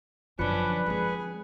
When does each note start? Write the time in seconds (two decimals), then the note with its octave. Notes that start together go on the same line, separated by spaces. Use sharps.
0.39 F#2 D3 F3 C#4 D4 B4 C#7
0.86 G#3 C4 G#4